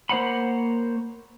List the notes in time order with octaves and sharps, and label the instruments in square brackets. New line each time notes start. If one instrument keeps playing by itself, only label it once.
[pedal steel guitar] A#3 C5 C#5 F#5 B5